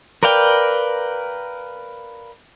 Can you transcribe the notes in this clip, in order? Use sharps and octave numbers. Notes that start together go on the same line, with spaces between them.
A#4 B4 D5 F5 G5